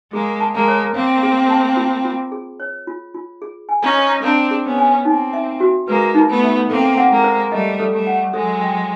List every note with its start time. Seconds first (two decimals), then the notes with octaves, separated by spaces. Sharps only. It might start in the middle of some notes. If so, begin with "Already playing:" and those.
0.13 G#3 A#3 G#4
0.40 A5
0.54 G#3 A#3
0.68 C#5
0.95 A#3 C4 F5
1.23 G#4
1.50 A5
1.77 F4
2.05 F4
2.32 G#4
2.60 C#5
2.87 F4
3.14 F4
3.42 G#4
3.69 G#5
3.83 C#4 D#4
3.96 C5
4.23 C4 D4 F5
4.51 G#4
4.65 B3 C#4
4.78 G#5
5.05 A#3 C4 D#4
5.33 E5
5.60 F#4
5.88 G#3 A#3 B4
6.15 D#4
6.29 A3 B3
6.42 E5
6.70 A#3 C4 A4
6.97 F#5
7.11 G#3 A#3
7.24 C5
7.52 G3 A3 D#5
7.80 A4
7.93 G3 A3
8.07 F#5
8.34 F#3 G#3 A4
8.61 G5